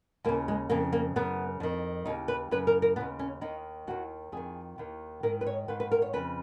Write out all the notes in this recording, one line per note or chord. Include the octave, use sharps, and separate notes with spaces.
D#2 C#3 A#3
G#3
F2 C#3 A#3
A#3
F#2 C#3 B3
F2 D#3
D#2 C#3 D#4
B4
F#2 C#3 B4
A#4
A#4
D#2 C#3 B3
C#4
D#2 D#3 D#4
D#2 D#3 F#4
F2 D#3 G#4
D#2 D#3
G#2 D#3 A#4
B4
C#5
G#2 D#3 B4
B4
A#4
C#5
F2 C#3 B4